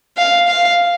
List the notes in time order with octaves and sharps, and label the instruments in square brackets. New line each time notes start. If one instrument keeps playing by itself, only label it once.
[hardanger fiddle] F5
F5